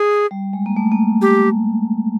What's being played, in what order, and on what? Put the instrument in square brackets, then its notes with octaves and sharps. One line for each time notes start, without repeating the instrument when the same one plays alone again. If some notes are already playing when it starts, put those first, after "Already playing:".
Already playing: [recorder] G#4
[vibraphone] G3
G#3
A#3
A3
A#3
[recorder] G4